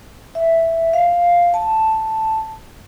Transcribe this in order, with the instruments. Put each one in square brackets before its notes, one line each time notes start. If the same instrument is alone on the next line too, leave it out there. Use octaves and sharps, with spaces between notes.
[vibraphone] E5
F5
A5